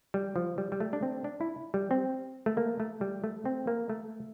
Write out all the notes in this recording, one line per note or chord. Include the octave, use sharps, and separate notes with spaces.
G3
F3
G3
G3
A3
D4
C4
D4
E4
G3
C4
A3
A#3
A3
G3
A3
C4
A#3
A3